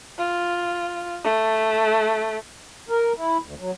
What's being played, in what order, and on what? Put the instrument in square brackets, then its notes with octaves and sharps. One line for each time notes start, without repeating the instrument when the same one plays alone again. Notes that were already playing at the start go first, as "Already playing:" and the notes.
[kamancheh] F4
A3
[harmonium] A#4
E4
D2
F#3